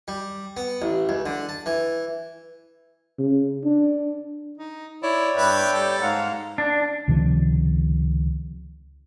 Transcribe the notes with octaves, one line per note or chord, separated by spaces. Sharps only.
G3
B3
A1
C#2
D3
A5
E3
C#3
D4
D#4
E4 C#5 D5
G2 B4 E5 G5 B5
G3 A4
G#2 F5 F#5 A#5
D4
C#2 C3 D#3 F3